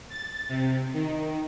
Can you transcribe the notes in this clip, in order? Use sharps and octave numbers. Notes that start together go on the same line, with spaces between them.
A6
C3
D#3